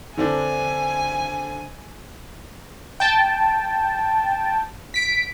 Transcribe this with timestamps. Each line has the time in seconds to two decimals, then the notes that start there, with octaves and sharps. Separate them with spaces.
0.17 D3 C4 D4 G#5
3.00 G5 A5
4.94 B6 D7